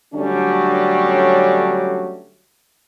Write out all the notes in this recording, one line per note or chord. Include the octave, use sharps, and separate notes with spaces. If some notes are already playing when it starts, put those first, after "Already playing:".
D3 F#3 G3 A3 C#4 D4